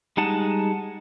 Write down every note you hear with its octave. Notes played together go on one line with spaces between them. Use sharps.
G3 G#3 D#4 F#5 A5